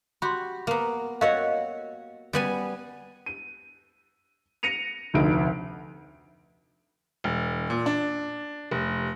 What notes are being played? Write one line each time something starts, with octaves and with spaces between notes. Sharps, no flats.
F#4 G4 B5 C6
A#3 B3
F#4 A#4 C#5 D#5 F5 F#5
G3 B3 G#5
D#7
A#6 C#7 D#7 F7
F1 D2 D#4 D7
E1
A#2
D4
F1